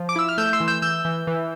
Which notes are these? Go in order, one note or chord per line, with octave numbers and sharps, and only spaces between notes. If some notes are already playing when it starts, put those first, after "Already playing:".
Already playing: F3
D6
E4 E6
F6
A3 E6 G6
C6 E6
E3
E6 G6
E3 E6 G6
E3
E3